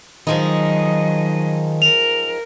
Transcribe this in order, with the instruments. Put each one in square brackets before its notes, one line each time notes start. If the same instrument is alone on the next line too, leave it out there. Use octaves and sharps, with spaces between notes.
[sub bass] D#3 [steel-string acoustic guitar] F3 G#3 D#4 [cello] F#3 D#5
[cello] A#4 [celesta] F7